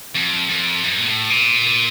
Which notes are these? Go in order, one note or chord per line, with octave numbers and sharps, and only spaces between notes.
F2
F2
F#2
A#2
A2
A#2